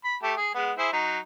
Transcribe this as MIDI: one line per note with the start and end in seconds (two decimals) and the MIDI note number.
0.04 0.17 83
0.23 0.33 57
0.23 0.33 67
0.23 0.33 81
0.37 0.54 68
0.55 0.72 56
0.55 0.72 59
0.78 0.90 64
0.78 0.90 68
0.78 0.90 72
0.93 1.19 54
0.93 1.19 63